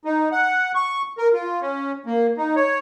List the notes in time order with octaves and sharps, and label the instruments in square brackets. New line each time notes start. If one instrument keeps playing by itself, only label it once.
[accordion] D#4
F#5
C#6
A#4
F4
C#4
A#3
D#4
C#5